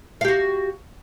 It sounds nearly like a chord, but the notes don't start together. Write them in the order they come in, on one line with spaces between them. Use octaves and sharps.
F5 G4 F#4